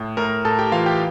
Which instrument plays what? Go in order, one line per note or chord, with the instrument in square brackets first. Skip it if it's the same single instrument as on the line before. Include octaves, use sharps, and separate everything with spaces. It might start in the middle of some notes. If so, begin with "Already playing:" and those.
Already playing: [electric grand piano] A2
A2 A#4 A#5
A2 A4 A5
G4 G5
E3 F4 F5
G4 G5